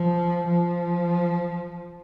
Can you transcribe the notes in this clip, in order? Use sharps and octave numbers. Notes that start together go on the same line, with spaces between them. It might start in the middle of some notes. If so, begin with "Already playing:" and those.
Already playing: F3
F3